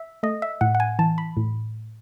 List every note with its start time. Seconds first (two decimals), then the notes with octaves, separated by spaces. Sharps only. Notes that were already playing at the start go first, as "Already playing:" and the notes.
Already playing: E5
0.23 A3 D#5
0.42 E5
0.61 A2 F#5
0.75 F#5
0.80 G#5
0.99 E3 A5
1.18 B5
1.37 A2